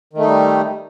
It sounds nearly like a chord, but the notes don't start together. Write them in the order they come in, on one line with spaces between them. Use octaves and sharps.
D#3 A3 D#4 G3